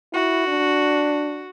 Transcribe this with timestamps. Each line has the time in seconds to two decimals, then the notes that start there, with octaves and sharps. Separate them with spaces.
0.13 E4 F#4
0.48 D4